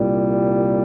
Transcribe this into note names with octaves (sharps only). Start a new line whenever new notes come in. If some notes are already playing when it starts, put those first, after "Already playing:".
Already playing: C2 A#2 G3